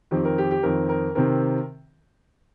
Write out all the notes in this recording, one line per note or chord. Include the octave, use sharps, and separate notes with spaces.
F2 D#3 C4 G4
A#4
G4
G4
F2 D#3 C4 A#4
A#4
C3 D#3 C4 A#4